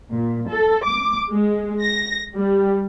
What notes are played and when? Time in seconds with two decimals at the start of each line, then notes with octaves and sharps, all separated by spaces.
0.13 A#2
0.49 A4
0.84 D6
1.31 G#3
1.82 A#6
2.35 G3